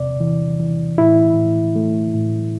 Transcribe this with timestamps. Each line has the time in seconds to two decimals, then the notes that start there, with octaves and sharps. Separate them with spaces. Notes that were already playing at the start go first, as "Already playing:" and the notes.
Already playing: E2 C3 D5
0.20 E3
0.60 E3
0.98 A2 E4
1.36 A2
1.76 A3
2.14 A2